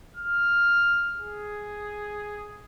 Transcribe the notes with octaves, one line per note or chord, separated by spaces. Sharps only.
F6
G#4